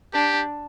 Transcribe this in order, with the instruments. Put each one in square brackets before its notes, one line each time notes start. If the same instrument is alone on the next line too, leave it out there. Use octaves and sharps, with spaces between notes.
[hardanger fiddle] D4 [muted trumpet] G4